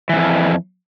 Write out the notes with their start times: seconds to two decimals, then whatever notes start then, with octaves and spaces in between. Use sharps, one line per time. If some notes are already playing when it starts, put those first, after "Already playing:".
0.09 E3
0.13 G#2
0.16 F2